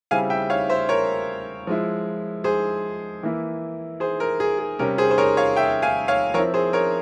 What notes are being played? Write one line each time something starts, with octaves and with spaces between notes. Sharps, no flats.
C#3 G3 C4 E4 F5 G#5
E5 G5
C#5 F5
C5 E5
A#4 C#5
F3 G#3 E4
G#4 C5
E3 A#3 E4
G#4 C5
A#4
G#4
G#4
C3 G3 C#4 A#4
G#4 C5
C5
A#4 C#5
C#5 F5
E5 G5
F5 G#5
C#5 F5
F3 C4 E4 A#4 C#5
G#4 C5
A#4 C#5